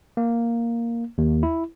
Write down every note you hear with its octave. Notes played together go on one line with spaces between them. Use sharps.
A#3
D#2
E4